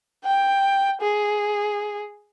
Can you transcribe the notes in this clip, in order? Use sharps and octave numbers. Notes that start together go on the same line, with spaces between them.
G5
G#4